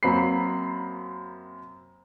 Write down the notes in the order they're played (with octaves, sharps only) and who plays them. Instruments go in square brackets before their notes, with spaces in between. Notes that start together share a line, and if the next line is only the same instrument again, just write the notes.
[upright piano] F#2 F#3 A#3 C4 B5 C7